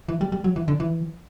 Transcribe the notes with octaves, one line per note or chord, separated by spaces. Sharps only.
E3
G3
G3
F#3
E3
D3
E3